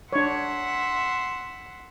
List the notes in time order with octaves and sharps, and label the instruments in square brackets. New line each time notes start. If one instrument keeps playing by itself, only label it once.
[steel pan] D4 C#5 [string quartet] E5 F#5 C6